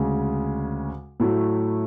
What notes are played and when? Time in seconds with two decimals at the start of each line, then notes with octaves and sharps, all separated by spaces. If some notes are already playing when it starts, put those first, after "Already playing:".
Already playing: D2 C#3 G#3
1.20 A2 F#3 A3 E4